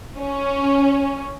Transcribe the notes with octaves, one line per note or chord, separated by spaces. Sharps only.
C#4